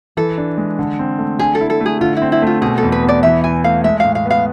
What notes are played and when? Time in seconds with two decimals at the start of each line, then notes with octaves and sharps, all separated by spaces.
0.17 E3 A4
0.38 D4
0.58 G#3
0.79 D3
0.99 C4
1.19 A3
1.39 D3 G#4
1.55 A4
1.61 E4
1.70 A4
1.81 A3
1.86 G#4
2.01 D3 F4
2.17 E4
2.22 C4
2.32 E4
2.42 A3 F4
2.62 B2 G#4
2.78 A4
2.83 E2
2.92 B4
3.03 B3
3.09 D5
3.23 E3 E5
3.44 E4 G#5
3.64 A3 F5
3.84 G#3 E5
4.00 A2 F5
4.15 F5
4.26 B3 F5